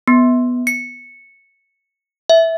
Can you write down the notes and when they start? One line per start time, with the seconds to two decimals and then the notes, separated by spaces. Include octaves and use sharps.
0.08 B3
0.67 C#7
2.30 E5